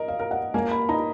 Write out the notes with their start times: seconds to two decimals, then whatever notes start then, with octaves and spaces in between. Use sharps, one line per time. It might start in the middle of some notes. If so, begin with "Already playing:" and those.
Already playing: A#4 D#5
0.08 F5
0.19 A#4
0.31 F#5
0.54 A#3 G#5
0.71 B5
0.89 D#4 A#5